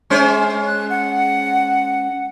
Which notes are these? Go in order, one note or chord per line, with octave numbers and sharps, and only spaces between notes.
G#3 C#4 C5
F#6
F#5